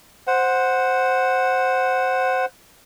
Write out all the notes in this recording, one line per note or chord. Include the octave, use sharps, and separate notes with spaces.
C5 F#5